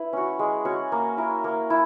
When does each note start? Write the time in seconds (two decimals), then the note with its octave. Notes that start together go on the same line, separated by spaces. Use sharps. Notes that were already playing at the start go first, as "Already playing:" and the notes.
Already playing: E4 B4
0.13 C#4 F#4
0.39 G#3
0.65 C#4 F#4
0.92 A#3
1.17 E4 A#4
1.44 A#3
1.70 E4